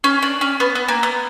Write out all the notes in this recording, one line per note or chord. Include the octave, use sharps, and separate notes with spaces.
C#4
D4
C#4
B3
B3
A#3
B3